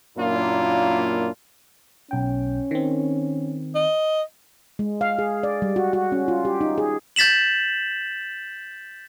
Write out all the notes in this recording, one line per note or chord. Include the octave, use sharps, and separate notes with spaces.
F#2 A#2 A#3 D4 E4 F4
B1 C#4 G5
D#3 C4
D#5
G#3
F5
G#4
D5
G3
F#4
F#4
C#4
F4
G4
D#4
G#4
G6 A6 B6 E7 F#7